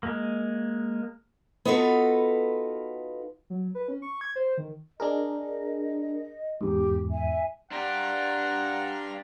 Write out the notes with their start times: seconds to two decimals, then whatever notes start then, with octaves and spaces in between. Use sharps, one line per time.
0.03 G#3 A#3
1.65 B3 D#4 F4 F#4 A4 B4
3.50 F#3
3.75 B4
3.88 C#4
4.02 C#6
4.21 G#6
4.36 C5
4.58 D#3
5.00 D4 G#4 A#4 D#5
6.61 E2 G#2 G4
7.10 E5 G#5
7.71 D4 G4 F5 F#5 A#5 C6